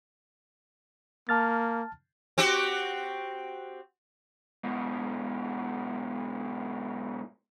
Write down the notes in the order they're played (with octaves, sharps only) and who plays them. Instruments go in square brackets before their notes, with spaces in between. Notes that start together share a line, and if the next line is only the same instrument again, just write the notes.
[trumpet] A#3 [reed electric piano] A5 F6 A6
[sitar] C4 F#4 G4
[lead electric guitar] G#2 B2